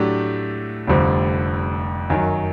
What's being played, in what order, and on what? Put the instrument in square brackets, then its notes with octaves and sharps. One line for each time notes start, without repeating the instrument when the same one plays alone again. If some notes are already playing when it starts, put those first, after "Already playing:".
Already playing: [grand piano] A2 F#3 A3 D4 G4
F1 F2 D3 G3 C4
F#2 D#3 F#3